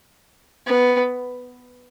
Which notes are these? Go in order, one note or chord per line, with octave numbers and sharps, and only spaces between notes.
B3